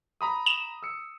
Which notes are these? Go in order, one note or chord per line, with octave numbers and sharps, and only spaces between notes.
A#5 B5 D#6
E7
E6 C#7